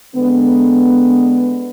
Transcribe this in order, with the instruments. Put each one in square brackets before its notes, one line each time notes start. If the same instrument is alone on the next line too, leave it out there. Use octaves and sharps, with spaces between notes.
[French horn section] D3 G#3 B3